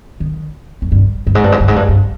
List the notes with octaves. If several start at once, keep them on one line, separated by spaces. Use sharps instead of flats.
D#3
F2
G2
G2
G#2
G2
G#2
G2
G#2
G2
G2